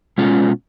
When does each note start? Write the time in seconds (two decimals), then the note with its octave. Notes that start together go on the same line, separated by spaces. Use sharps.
0.18 B2 G#3 C#4 F4